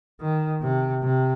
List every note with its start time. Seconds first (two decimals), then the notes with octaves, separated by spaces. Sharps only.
0.21 D#3
0.62 C3
1.03 C3